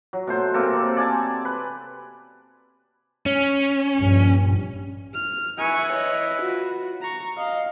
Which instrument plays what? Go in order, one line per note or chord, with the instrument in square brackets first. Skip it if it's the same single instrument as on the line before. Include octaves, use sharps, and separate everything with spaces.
[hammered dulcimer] F#3
B2 A3 C5
C3 A#3 A4 A#4
C4
D5 G#5 A5
B4
[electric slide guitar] C#4
[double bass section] A#1 G2
[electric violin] F6
[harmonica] E4 B4 [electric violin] G#5 C#6
[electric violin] C#5 D#5
F4 F#4
A#5 C#6
[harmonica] D#5 [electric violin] F5